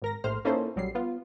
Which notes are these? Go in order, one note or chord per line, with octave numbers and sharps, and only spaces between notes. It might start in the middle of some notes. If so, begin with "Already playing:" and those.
G#1 A#4 A#6
A#1 A2 C5 F6
A#3 C#4 D#4 E4 A4 C5
A#1 F#3 G3 C7
B3 F4